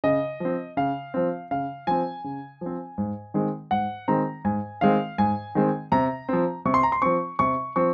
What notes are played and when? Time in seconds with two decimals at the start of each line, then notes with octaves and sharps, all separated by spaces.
0.04 C#3 D#5
0.40 F3 C4
0.77 C#3 F5
1.14 F3 C4
1.51 C#3 F5
1.87 F3 C4 G#5
2.24 C#3
2.61 F3 C4
2.98 G#2
3.34 D#3 G#3 C4
3.71 G#2 F#5
4.08 D#3 G#3 C4 A#5
4.45 G#2 G#5
4.81 D#3 G#3 C4 F5
5.18 G#2 G#5
5.55 D#3 G#3 C4
5.92 C3 A#5
6.29 F3 C4
6.65 C3 C#6
6.74 C6
6.83 A#5
6.92 C6
7.02 F3 C4 C#6
7.39 C3 C#6
7.76 F3 C4 C#6